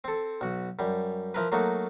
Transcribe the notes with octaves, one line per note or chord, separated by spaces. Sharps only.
C4 A4
B1 F#4
F#2 G3
F3 E4 A#4 B4
F#3 A3 A#3 D#4 F#4